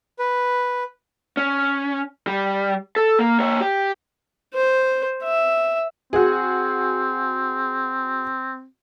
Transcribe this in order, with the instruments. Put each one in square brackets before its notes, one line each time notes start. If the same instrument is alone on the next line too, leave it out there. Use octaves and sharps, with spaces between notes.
[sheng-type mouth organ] B4
[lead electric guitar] C#4
G3
A4
A#3
A#3 C#5
G4
[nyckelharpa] C5
E5
[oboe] C4 [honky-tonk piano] F#4 G#4